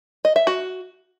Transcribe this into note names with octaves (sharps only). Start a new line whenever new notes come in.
D#5
E5
F#4